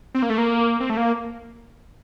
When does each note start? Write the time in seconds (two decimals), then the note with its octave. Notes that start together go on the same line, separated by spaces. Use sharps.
0.15 C4
0.22 A#3
0.30 A3
0.38 A#3
0.80 C4
0.90 A3
0.97 A#3